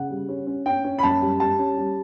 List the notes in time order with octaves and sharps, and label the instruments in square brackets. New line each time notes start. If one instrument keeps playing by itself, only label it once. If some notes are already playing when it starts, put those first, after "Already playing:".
Already playing: [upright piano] C#3 F#5
G3
C#4
C#4
C#4 G5
C#4
B5
F#2 A5
G3
G3 A5
C#4
G3